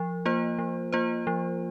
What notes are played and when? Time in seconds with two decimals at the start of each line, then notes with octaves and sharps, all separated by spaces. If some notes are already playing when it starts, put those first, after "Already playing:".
Already playing: F3
0.25 A#3 F4 C5
0.59 F3
0.93 A#3 F4 C5
1.27 F3